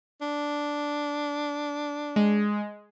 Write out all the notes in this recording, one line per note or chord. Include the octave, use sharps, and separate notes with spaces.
D4
G#3